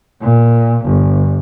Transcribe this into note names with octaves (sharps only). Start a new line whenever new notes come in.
A#2
G1